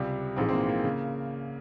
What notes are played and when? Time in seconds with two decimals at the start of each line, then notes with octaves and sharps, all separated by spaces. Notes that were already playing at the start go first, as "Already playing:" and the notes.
Already playing: C#2 C3 G3
0.36 A#1 G#2 E3 G#3 C4
0.49 C4
0.53 A#3
0.69 A#3
0.84 C#3